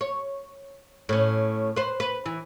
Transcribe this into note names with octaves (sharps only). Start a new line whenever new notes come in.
C#5
A2 C#4
B4 C5
B4
E3